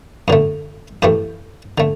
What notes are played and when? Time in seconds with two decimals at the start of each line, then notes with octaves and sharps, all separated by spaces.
0.28 F#2 D3 A3
1.02 F#2 E3 A3 G4
1.78 D3 A3